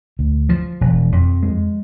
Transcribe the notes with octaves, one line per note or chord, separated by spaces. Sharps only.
D2
F3
E1
F2
G#3